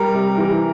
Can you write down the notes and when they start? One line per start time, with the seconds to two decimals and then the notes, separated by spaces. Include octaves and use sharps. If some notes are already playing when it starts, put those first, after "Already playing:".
Already playing: G3 A#4
0.14 C3
0.38 E3